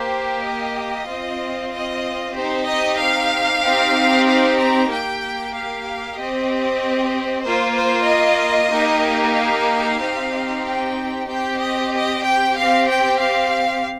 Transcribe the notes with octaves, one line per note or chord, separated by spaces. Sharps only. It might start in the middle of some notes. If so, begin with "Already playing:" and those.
Already playing: A#3 G4 C5
D#5
C4 F4
D#5
C4 D#4 G4 C5
D#5
F5
C4 D#4 G4
F5
A#5
A#3 G4 G5
F5
C4 G4 D#5
A#3 F4 C5
C5
D#5
A#3 D#4 G4
F5
C4 D#4 G4
G5
C4 G4 G5
D#5
D#5
G5
C4 G4 F5
G5
F5